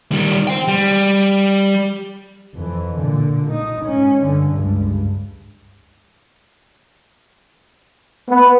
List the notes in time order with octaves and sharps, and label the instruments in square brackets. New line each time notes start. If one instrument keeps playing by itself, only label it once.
[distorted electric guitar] D#3 G3
C5 G5
G3
[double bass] F2 E3
A#2 D3
D#4
G#2 C#4
G2 D3
C#2 G2
[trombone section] B3